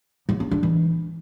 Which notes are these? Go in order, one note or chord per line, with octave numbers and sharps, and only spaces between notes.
F#3
C#4
D4
E3